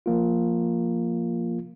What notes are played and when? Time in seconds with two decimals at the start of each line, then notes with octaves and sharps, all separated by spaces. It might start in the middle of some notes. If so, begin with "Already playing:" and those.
0.06 F3 A#3 F4